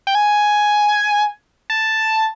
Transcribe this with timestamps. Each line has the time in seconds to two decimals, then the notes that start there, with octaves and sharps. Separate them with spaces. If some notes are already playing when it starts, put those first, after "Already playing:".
0.07 G5
0.15 G#5
1.70 A5